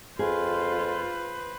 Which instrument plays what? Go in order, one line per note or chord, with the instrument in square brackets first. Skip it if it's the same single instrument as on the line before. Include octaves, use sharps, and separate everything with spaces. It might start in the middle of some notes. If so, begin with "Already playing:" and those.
[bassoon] F2 [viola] F4 [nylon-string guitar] G#4 [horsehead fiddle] B4 C5